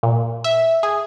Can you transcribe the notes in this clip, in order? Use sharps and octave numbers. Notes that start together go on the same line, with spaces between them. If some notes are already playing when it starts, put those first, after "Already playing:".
A#2
E5
G#4